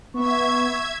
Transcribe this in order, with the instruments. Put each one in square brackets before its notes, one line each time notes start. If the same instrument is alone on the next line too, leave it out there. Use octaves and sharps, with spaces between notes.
[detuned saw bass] B3 [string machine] E5 G#6 [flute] C#6